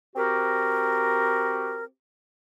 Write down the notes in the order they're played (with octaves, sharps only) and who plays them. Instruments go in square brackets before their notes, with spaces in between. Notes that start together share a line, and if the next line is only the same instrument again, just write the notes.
[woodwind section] C4 F#4 G4 A#4